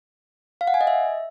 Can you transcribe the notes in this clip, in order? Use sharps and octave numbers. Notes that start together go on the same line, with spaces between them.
F5
F#5
G#5
D#5
E5